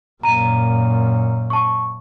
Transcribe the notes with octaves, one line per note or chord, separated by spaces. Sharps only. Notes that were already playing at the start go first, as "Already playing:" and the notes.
F#2 A#2 A#5 D#7
A5 C#6